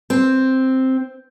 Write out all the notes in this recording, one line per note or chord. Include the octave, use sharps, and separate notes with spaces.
C4